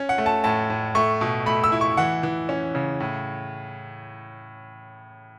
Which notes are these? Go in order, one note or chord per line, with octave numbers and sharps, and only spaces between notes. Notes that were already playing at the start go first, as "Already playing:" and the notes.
Already playing: C#4
F#5
A3
A5
A2 A5
A2
A3 C#6
B2
A3 B5
E6
E4
C#6
E3 F#5
E3
C#4
C#3
A2